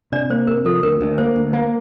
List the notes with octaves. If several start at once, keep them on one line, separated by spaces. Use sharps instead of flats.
C3 D4 D5
A#3 C5
C3 A#4
F3 A4
D2 A#4
D2
A#3 C5
D2
A#3